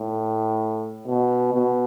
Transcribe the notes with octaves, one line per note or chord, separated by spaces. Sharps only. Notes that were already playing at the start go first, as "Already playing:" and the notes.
Already playing: A2
B2
B2